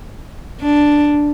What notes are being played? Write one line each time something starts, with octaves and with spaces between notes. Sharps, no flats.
D4